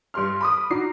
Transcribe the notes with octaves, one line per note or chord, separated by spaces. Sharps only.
G2 G3 C6 F6
B5 D6 D#6
D4 D#4 F#4 D6 C7